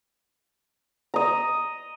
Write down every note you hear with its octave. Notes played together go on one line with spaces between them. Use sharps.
D#5 A#5